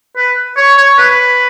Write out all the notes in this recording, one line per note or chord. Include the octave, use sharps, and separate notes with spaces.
B4
C#5
C#5
B4